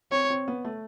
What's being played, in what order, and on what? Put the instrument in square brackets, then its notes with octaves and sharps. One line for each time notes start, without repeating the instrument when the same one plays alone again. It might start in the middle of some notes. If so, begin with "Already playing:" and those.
[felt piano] C4 [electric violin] C#5
[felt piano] C4
B3
A3